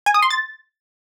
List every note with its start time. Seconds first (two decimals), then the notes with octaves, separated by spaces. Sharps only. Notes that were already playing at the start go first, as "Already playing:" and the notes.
0.06 G#5
0.14 D#6
0.22 C6
0.30 A6